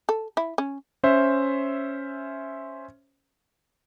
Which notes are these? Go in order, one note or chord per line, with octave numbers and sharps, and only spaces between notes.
A4
E4
C#4
C#4 C5 E5